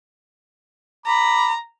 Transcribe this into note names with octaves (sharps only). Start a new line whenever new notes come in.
A#5 B5 D6